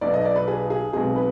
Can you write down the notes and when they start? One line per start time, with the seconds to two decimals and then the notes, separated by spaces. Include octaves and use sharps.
0.01 B1 B2 B3 D5
0.14 D#5
0.25 D5
0.36 B4
0.48 G#4
0.70 G#4
0.93 B1 B2 G#3 C4 G#4
1.16 B4